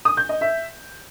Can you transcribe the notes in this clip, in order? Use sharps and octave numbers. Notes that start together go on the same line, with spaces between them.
D#6
G6
D#5
E5